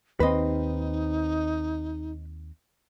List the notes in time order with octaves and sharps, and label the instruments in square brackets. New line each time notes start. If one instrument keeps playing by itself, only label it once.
[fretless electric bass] D#2 C4 [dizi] D#4 [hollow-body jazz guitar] B4 C5 D#5